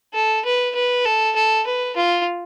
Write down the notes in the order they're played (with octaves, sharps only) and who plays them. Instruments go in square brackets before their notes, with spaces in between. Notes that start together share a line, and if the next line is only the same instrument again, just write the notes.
[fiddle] A4
B4
B4
A4
A4
B4
F4